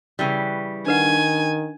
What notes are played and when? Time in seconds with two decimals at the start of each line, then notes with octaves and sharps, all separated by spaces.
0.19 C#3 E3 G3
0.87 D#3 D4 B4 F#5 G#5